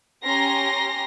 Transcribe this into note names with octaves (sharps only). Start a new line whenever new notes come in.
C#4 G4 A#5 C6 A#6